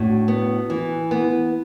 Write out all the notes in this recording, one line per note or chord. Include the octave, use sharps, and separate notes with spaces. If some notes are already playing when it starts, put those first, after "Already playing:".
Already playing: A2 D4 F#4
B3
E3
B3